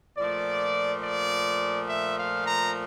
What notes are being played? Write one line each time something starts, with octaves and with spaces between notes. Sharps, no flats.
A#2 F3 A3 D5
D5
E5
F5
A#5